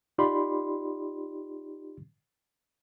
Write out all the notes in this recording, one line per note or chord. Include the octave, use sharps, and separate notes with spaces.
D#4 F4 G4 D5 B5 C6